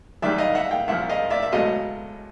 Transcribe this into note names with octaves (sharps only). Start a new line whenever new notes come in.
F#2 D#3 G3 D5 E5
D#5 F5
E5 F#5
F5 G5
C2 A#2 F3 E5 F#5
D#5 F5
D5 E5
E5
C#2 B2 F#3 A3 D#5 F5